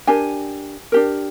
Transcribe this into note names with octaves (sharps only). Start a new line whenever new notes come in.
D4 G4 A#4 G#5
D4 G4 A#4